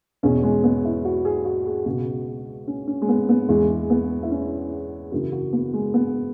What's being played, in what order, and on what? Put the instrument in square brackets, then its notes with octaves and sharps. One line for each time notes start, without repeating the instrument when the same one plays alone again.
[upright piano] E2 B2 C#4
G#3
B3
E4
F#4
G#4
F#4
G#4
C#2 B2 F#4
C#4
C#4
G#3
B3
B3
E2 E3 G#3
B3
E4
C#4
F#2 C#3 E3 F#4
F#4
B3
G#3
B3